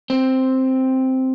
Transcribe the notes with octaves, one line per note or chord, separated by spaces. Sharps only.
C4